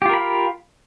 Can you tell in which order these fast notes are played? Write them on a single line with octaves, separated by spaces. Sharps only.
G4 F4 A#4 B5 F5